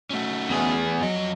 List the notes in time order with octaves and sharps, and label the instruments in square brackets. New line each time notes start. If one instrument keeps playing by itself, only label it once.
[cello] A3 [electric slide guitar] C#4 D#4 F#4
[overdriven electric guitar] E2 G#4
[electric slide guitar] F2 D#5 [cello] F#3